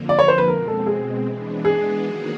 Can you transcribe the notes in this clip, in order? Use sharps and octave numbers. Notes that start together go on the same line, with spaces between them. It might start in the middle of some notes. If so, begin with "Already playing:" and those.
Already playing: F2 D3 F3 A#3
D5
C#5
C5
B4
B2 G#3 C4 A#4
A4
G#4
E3 G#3 B3 D4
G#4
D#3 F#3 A#3 D#4 F#4